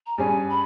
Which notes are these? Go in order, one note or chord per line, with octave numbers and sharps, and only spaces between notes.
A#5
G2 G3 C#4 G#4 G#5
B5